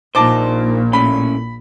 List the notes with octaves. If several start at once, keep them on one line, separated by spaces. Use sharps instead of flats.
A#1 A#2 D#4 C5 A5 D6
A2 A3 C#4 B5